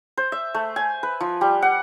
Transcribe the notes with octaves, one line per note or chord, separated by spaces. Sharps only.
C5
E5
A3
G#5
B4
F3
G3
F#5